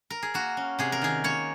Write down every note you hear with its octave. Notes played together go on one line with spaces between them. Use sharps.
A#4
G#4
A#3 F#4
C#4
C3 G#4
A#4
D#3 G#4
A#3 C#5